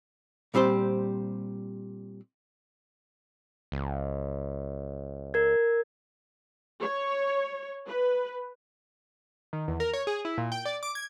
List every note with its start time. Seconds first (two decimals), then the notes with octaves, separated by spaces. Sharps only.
0.54 A#2 G3 C4 G4 C5
3.72 C#2
5.34 A#4 G#6
6.80 C#5
7.88 B4
9.53 D#3
9.68 E2
9.80 A#4
9.93 C#5
10.07 G#4
10.25 E4
10.38 A#2
10.52 G5
10.65 D5
10.83 D6
10.95 G#6